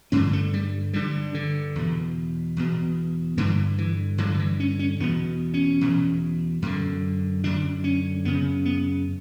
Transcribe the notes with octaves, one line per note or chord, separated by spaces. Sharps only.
G2 D3 C#4
A3
G3
G2 D3 G3
D3
E2 B2
E2 B2
G2 D3 E3
E3
G2 D3 F#3
F#3
E3
C#4
C#4
E2 B2 B3
C#4
E2 B2
F#2 D3
F#2 D3 D4
C#4
F#2 C#3 B3
B3